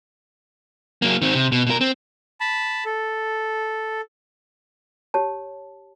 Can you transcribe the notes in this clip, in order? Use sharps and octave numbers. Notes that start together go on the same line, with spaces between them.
F#3 A#3
D#3 C4
C3
B2
B2 A#4
C4
A5 B5
A4
G4 C#5 A5